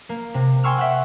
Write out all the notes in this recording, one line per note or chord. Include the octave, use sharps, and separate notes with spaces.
A#3
C3
G5 G#5 C6 C#6 E6 F6
E5 F#5